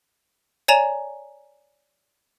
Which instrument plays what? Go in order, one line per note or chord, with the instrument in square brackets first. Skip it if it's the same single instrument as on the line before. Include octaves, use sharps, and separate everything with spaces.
[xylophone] C#5 D5 G#5 A#5 E7 F7